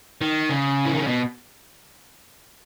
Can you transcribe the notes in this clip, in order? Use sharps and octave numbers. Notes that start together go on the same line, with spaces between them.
D#3
C#3
E3
D#3
C#3
B2